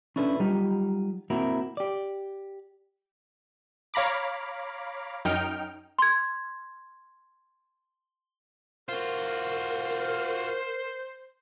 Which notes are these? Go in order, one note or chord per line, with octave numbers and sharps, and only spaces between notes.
C#4 D4 E4 A4 B4
F#3 G3 D#4 F4 G4
A#3 C4 E4 F#4 A#4
G4 D5
C#5 F5 A#5 B5 D6
F#2 D#4 G5 F6
C6 G#6
F4 F#4 A#4 C5